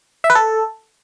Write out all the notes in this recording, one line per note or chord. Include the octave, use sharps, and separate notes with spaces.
E5
B4
A4